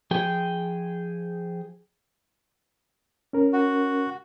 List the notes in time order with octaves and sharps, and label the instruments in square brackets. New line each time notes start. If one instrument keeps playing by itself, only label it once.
[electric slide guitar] F3 G#4 G5
[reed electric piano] C#4 A#4
[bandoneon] F#4